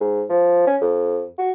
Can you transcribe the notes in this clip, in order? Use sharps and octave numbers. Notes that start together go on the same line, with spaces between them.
G#2
F3
C#4
F2
F#4